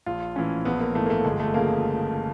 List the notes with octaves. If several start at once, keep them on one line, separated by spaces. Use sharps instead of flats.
A#1 F4
A2 E3 C#4
A#1 B3
A#3
G#2 E3 A3
A#3
A3
G1 G#3
A3
C#3 F3 A#3